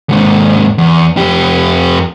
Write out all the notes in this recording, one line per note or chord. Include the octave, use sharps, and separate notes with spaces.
D#2 G#2
E2
F2 G4